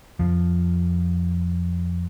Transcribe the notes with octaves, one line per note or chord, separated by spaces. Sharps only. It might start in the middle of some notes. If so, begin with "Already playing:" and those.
F2 F3